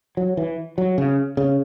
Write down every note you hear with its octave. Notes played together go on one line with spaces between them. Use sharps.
F#3
E3
F#3
C#3
C#3